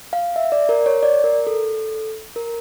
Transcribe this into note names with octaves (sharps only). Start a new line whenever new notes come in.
F5
E5
D5
A#4
C#5
D5
A#4
A4
A#4